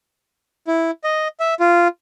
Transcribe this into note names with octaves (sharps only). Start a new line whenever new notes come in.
E4
D#5
E5
F4